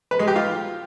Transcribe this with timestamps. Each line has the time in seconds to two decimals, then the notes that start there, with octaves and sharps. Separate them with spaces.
0.11 B4
0.19 G#3
0.28 G4
0.36 F4